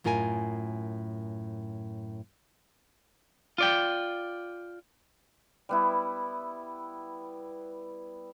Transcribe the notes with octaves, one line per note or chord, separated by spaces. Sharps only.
F#2 A2 F4 A#4 G5 G#5
F4 D5 G5
G3 B3 E4